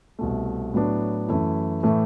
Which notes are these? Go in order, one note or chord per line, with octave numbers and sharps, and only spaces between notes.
C2 B2 A3
A2 F#3 B3 D4
F#2 E3 A3 E4
A2 E3 A3